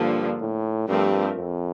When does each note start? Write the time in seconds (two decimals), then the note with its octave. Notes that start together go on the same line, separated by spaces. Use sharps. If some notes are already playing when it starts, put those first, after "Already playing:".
Already playing: G2 D3 F3 A#3
0.40 A2
0.88 G2 F3 A3 C4 G4 A#4
1.37 F2